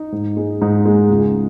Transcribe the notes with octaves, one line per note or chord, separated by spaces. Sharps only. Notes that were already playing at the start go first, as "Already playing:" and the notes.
Already playing: D#4
G#2
G#3
G#2 D#4
G#3
C#2